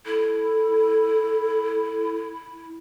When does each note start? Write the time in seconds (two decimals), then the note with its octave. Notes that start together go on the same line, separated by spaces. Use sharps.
0.06 E4 A4